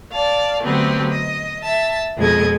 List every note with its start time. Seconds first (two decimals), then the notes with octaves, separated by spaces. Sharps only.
0.12 D5 F5 A5
0.63 D3 F#3 A3 B3 C4 G4
1.09 D#5
1.62 E5 A5
2.18 F2 B2 G#3 A4 D#5 G#6